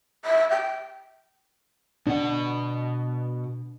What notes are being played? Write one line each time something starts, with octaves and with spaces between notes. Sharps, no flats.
E5
G5
B2 D4 F#5